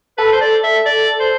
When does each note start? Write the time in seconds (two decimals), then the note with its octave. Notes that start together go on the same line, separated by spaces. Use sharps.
0.18 A4 B4
0.32 C5
0.40 D5
0.63 E5
0.85 D5
1.19 C5